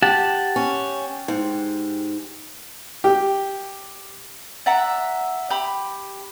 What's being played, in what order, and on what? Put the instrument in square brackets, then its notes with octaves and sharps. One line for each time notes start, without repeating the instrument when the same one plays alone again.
[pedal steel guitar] G4 F#5 A5
[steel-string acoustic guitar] C#4
G#2
[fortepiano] G4
[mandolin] D5 E5 F#5 A#5
G4 B5